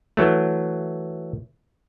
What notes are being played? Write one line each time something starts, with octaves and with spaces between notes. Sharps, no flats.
E3 F#3 A3